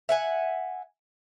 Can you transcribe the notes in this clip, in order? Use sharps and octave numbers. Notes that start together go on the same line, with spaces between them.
E5 F#5 G#5